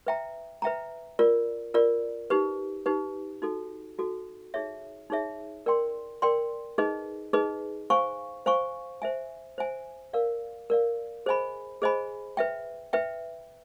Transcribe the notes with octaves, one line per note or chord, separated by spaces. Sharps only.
B4 E5 G5 A#5
B4 E5 G5 A#5
F4 A#4 D5
F4 A#4 D5
D#4 G4 B4
D#4 G4 B4
D#4 F#4 A4
D#4 F#4 A4
D#4 G#4 C#5 E5
D#4 G#4 C#5 E5
A#4 D5 G5 C6
A#4 D5 G5 C6
D#4 G#4 B4 D#5
D#4 G#4 B4 D#5
C5 F5 G#5 C#6
C5 F5 G#5 C#6
C5 E5 G#5
C5 E5 G#5
A#4 D5 F5
A#4 D5 F5
G#4 C5 D#5 G#5 B5
G#4 C5 D#5 G#5 B5
B4 E5 G5
B4 E5 G5